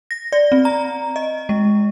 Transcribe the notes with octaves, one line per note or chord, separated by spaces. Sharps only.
A#6
D5
C4
A#5
D#5
G#3